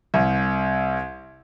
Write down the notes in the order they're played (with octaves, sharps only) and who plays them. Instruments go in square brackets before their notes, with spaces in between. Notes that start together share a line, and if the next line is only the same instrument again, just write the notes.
[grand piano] C2